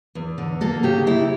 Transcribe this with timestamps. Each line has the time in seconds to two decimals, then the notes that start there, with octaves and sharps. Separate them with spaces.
0.15 E2
0.38 D3
0.61 A#3 A4
0.83 C#3 G4
1.07 C#3 E4